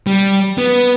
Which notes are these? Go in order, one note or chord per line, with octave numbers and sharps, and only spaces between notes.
G3
B3